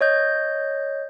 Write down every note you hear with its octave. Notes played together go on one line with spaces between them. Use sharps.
C#5 D#5 G6